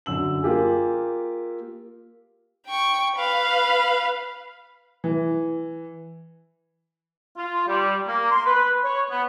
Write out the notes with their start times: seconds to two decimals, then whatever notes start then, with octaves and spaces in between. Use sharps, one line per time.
0.06 F#2 D3 E6 F#7
0.43 A#3 F4 G4 G#4
2.67 G5 C#6
3.16 B4 F5
5.04 E3
7.37 F4
7.68 G3
8.07 A#3
8.32 C6
8.46 B4
8.84 C#5
9.10 B3